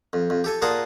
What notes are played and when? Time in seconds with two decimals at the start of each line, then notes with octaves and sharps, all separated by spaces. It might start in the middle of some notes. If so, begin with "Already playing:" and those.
0.13 F2
0.30 F2
0.44 G4 A4 G#5
0.62 A#2 G#4 A#4 F#5 A5 D#6